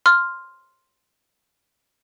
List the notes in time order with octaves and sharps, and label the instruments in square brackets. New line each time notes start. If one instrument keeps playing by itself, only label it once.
[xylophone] C6 F6